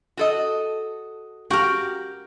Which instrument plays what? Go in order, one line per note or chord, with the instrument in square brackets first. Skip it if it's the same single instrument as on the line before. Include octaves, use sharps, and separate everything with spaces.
[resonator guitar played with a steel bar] F#4 A4 D#5
[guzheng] F#4 A#4 [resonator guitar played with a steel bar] G4